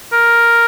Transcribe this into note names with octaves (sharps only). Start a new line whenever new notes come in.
A#4